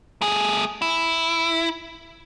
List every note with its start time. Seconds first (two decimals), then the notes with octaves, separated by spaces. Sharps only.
0.22 A3 G#4
0.82 E4